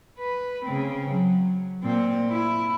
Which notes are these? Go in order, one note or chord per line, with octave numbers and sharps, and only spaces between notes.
B4
C#3 C4
F#3
A#2 C4
E4